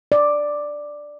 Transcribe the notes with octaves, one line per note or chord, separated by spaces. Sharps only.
D5